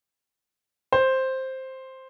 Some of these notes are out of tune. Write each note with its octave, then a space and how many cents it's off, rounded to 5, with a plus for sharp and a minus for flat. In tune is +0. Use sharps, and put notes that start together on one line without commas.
C5 +5